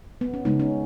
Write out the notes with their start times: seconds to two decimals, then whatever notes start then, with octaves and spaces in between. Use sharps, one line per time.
0.21 B3
0.34 C#4
0.45 C#3 G#3 B3 D#4
0.60 C#4